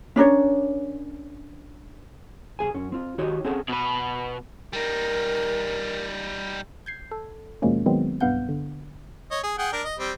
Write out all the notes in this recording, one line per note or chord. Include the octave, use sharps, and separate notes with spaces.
C#4 D4 A#4 C#5
B1 F#3 G#4 G#5
F#2 C#4
C4 F4
D#3 D#4 F#4 G4 C#5 D#5
C4 C#4 G#4 A4 C#5 F#5
B2 B4
G3 D#4 A#4
G6 G#6 C7
A4
D#2 B2 F3 G#3 A#3 C#4
D#3 F#3 G#3 B3 C4
B1 G2 B3 F5 F#5 G6
D3
C#5 D#5
G#4
G#4 F#5 G5
D4 A#4
D#5
G3 C4